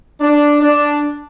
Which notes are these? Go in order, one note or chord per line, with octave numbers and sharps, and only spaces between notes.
D4
D4